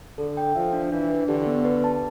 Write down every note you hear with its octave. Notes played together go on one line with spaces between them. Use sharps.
D3 A4
G5
F3 E5
D4
E3 D4
B4
D3 G4
B3
B4
A5